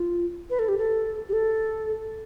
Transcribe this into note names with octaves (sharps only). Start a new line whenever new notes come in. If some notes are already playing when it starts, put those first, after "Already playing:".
Already playing: F4
B4
A4
G4
A4
G4
A4